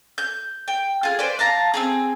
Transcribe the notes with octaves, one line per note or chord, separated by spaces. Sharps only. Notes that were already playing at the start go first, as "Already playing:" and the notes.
G6
G5
F4 G#4
B4 C5 D5
F5 A5 A#5
C4 C#4 G#4